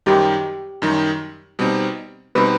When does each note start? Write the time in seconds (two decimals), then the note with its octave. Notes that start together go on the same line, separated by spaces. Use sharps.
0.06 F#2 D#3 G3 D#4 G4
0.82 F#2 D#3 G3 D#4
1.59 B2 G3 C4 D#4
2.35 B2 G3 C4 D#4 B4